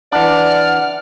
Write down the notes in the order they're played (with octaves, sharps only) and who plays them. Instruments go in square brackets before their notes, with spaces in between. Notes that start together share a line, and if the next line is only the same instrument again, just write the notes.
[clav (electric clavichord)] E3 D4 [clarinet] D5 [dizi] F#5 [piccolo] F6